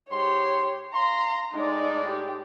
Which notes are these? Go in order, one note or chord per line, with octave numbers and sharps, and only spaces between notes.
G#2 G4 C#5 C6
F5 A#5 C6
A2 G#3 D#4 D5
G4